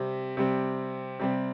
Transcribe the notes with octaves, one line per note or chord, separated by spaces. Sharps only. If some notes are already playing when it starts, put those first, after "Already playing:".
Already playing: C3 G3 C4
C3 G3 C4
C3 G3 C4